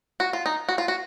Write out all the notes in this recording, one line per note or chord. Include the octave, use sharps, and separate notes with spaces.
F#4
F4
D#4
F#4
F4
F#4